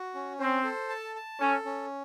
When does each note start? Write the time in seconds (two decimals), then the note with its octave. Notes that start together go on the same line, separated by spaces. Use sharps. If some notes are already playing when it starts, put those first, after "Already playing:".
Already playing: F#4
0.15 C#4
0.39 C4 C5
0.64 A4
0.89 A5
1.16 A5
1.40 C#4 A4
1.65 C#4